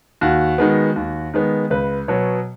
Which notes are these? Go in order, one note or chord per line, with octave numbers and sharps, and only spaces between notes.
D#2 F#4
D#3 G#3 B3
D#2
D#3 G#3 B3
C#2 B4
B2 F#3 B3 C#5